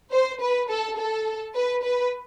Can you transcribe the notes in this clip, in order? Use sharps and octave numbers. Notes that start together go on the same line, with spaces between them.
C5
B4
A4
A4
B4
B4